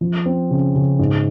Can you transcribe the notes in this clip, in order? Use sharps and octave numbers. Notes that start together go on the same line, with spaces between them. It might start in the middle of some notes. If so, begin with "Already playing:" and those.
F3
C4
C#3
C#3
G#2